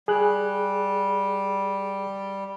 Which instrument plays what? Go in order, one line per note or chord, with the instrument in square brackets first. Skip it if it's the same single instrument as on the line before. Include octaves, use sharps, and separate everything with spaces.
[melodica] G3 [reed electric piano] G#4 F#6